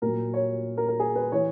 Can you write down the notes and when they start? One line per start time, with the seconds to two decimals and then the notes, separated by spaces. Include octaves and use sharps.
0.02 A#2 F#3 A#4
0.34 C#5
0.77 A#4
0.88 A#4
0.99 G#4
1.15 B4
1.32 E3 C#5